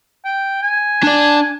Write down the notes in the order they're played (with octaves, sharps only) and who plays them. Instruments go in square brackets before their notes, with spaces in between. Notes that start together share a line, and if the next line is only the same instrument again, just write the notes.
[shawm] G5
G#5
[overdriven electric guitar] D4 D5